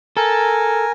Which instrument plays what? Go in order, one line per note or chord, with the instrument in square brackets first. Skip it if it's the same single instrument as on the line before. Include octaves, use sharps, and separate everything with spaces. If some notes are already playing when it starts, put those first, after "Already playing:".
[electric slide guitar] A4 [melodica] A#4 G#5